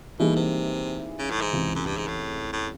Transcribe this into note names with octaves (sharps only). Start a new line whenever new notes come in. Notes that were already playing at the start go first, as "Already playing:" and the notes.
B2 E3 G3 A#3 D#4 G#4
C3
C#3
A2
G#2
C#2 C3 E3 G#3
F#2
G2
G#2
A2
A2